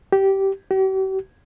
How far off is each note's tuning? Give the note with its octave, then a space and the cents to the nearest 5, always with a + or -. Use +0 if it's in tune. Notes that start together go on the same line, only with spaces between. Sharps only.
G4 -15
G4 -45